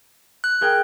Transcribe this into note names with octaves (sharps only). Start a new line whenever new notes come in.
F#6
G#4 A#4 G5